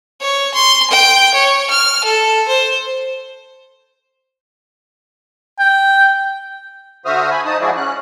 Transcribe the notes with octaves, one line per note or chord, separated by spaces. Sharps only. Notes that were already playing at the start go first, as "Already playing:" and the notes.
C#5
C6
G5
C#5
F6
A4
C5
G5
D3 F#4 C5 E5 D#6 F6
G#5 B5
F3 D#4 A5 D#6
F3 G#3 E4 F#4 G#4 D5
C#4 F#6